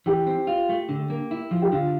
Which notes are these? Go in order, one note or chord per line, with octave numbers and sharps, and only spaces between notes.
E3 G4
C4
F4
A3
D3
A#3
E4
F3
G4
D3 F4